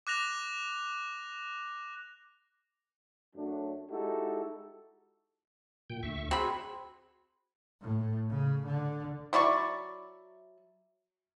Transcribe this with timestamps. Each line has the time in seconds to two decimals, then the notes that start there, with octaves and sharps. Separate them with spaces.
0.07 D6 F#6 A#6 F7
3.36 F#2 F#3 A3 D4
3.91 G#3 D#4 E4 F#4 G4 A4
5.90 A#2 G5
6.03 D2 E5 C#6
6.31 C4 F#4 G#4 B5
7.82 A2
8.29 C#3
8.66 D3
9.33 F#3 E4 D5 C#6